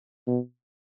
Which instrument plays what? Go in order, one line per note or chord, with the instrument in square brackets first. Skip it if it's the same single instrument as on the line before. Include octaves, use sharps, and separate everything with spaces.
[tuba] B2